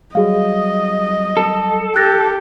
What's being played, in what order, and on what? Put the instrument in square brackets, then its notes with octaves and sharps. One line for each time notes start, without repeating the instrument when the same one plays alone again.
[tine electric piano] F#3 G3 [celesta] F#4 G#4 F5 [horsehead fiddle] D#5
[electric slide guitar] A4
[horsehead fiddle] G4 [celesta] F#6 A6 A#6